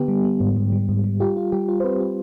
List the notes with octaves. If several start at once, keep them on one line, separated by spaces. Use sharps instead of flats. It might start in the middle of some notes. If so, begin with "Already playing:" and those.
Already playing: D3 B3 G4
G3
B3
G#2
G#2
G3
G#2
G3
F4 G4
F4
G3 G4
F4
C5
C4 G4 B4
F4